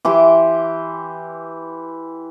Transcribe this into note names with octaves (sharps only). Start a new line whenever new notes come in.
E3 G4 C6 D6